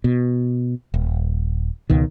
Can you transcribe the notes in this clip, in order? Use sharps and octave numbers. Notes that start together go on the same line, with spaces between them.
B2
D#1
C#2 B2 D#3